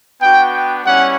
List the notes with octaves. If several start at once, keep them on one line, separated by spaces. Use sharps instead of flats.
B3 D4 F#4 G5
G5
G3 C#4 E4 F#5